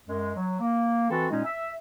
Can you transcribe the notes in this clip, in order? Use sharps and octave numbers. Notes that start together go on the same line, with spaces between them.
F#2 G#3
F#3
A#3
E3 C4 F#4 A4
A#2 G#3 C#4 D#4
E5